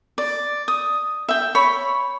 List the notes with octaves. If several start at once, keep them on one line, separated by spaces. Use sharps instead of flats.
D5
D#6
E5 G5
C#5 B5